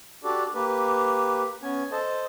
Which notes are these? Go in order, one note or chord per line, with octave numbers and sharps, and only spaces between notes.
D4 F#4 G4 A4 D5
A#3 G4 B4
B3 C#4 G#5
A4 C5 D#5 A5